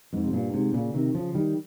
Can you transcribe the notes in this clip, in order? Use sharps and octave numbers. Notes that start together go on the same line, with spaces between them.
F2 G#2
C3
G2 A#2
G#2 C3
A#2 C#3
C3 D#3
C#3 F3
D#3 G3